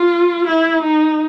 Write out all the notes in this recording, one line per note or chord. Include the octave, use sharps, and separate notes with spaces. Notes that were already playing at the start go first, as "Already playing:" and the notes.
Already playing: F4
E4
D#4